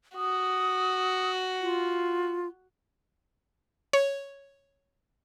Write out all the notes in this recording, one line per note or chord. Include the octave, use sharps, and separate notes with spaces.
F#4 D#6
F4
C#5